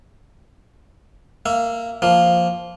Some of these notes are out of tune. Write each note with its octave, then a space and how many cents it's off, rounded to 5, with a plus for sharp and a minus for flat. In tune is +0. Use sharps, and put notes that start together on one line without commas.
A#3 -10 E5 +10
F3 +0 A#3 +0